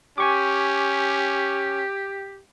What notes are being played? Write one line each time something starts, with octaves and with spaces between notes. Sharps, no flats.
C#4 G4 G#5 C#6 D6